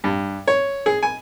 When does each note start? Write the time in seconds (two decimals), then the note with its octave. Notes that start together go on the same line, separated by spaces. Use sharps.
0.04 G2
0.47 C#5
0.86 G#4
1.02 G#5